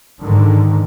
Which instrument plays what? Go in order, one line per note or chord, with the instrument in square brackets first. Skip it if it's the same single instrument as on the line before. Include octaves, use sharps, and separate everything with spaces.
[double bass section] G#2 D3 D#3